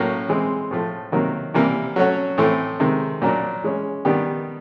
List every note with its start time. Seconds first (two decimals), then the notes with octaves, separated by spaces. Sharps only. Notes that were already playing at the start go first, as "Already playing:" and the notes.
Already playing: A2 F#3 A#3 C#4
0.29 E3 G#3 C4
0.71 A2 F3 A3
1.12 C3 D#3 F#3 A#3
1.54 C3 E3 G3 A#3
1.96 F#3 A3 C#4 F#4
2.38 A2 E3 A3 C4
2.80 C3 D#3 G#3
3.22 A#2 F#3 A#3 D4
3.63 E3 G#3 C#4
4.05 D#3 G3 B3 D4 G4